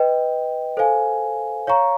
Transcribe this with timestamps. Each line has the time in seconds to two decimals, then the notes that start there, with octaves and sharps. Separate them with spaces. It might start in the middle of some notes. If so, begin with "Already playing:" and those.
Already playing: B4 D#5 G5
0.77 A4 C5 F5 G#5
1.67 C#5 F5 A#5 C#6